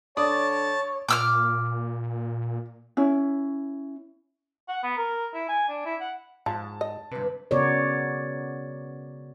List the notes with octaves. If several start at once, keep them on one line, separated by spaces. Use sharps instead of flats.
D3 C#5 D5 A5 D#6
A#2 D6 E6 F6
C#4 E4
F#5
B3
A#4
E4
G#5
D4
E4
F#5
G#2 F3 A5
D#5
G1 C3 B4
C#3 B3 F#4 A#4 C#5 D5